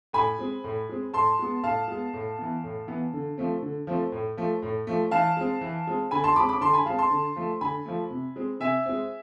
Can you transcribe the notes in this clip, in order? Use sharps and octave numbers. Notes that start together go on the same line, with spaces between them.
A2 G#5 B5
G#3 C4
A2
G#3 C4
A2 A5 C6
G#3 B3
A2 F5 A5
G#3 B3
A2
E3 B3
A2
E3 B3
D3
F3 A3 C4
D3
F3 A3 C4
A2
F3 A3
A2
F3 A3
E3 F5 A5
G#3 C4
E3
G#3 C4
D3 G#5 B5
A5 C6
G#3 C4 B5 D6
B5 D6
D3 A5 C6
G#5 B5
G#3 C4 F5 A5
A5 C6
D3
F3 A3
D3 G#5 B5
F3 A3
C3
G#3 C4
C3 E5 G#5
G#3 C4